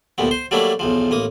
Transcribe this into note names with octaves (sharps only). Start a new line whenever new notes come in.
D2 G2 A#2 B3
C5 C6
F#3 G3 A3 A#3 D4 E4
B1 E2 F3
A1 A#3 D#6